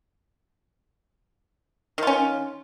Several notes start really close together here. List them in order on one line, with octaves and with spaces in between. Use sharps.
D#3 F4 C#4